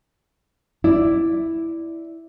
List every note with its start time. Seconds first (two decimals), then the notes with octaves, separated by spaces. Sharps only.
0.84 E4 D5